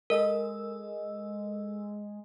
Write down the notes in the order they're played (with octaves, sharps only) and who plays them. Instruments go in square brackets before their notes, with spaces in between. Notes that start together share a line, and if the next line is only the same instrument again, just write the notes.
[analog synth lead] G#3 [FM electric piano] A4 D#5 E6 [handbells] A#4